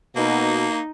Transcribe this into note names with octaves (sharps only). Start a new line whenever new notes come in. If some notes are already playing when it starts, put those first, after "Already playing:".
B2 A#3 D#4